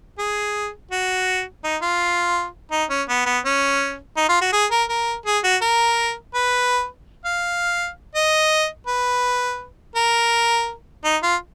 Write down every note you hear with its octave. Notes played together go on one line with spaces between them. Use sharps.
G#4
F#4
D#4
F4
D#4
C#4
B3
B3
C#4
D#4
F4
F#4
G#4
A#4
A#4
G#4
F#4
A#4
B4
F5
D#5
B4
A#4
D#4
F4